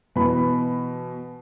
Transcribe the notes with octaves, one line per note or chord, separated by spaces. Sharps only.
B2 E3 B5